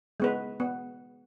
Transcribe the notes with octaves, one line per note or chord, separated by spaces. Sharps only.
G#3 B3 B4
B3